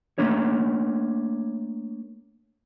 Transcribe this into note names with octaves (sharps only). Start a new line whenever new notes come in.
A3 A#3 D4 C#5